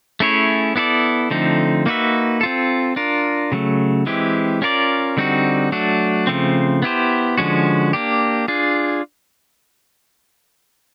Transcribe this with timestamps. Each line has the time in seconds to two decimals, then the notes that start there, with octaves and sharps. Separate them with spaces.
0.20 A3 C#4 E4 G#4 C#5
0.76 B3 E4 A4 D5
1.31 D3 F3 A3 C4 D#4
1.86 A#3 D#4 F#4 B4 E5
2.41 C4 F4 A4
2.96 D4 F4 A#4
3.52 C#3 F#3 A3
4.06 E3 G#3 C4 E4 G4
4.62 C#4 F4 A#4 D5
5.17 D3 G3 C4 D#4 F#4
5.72 F#3 A3 D4 F#4
6.27 C#3 F3 A3 C4
6.82 B3 E4 G4 C5
7.38 D3 F3 G#3 C#4 F#4
7.93 A#3 D4 G4
8.48 D4 F4 G#4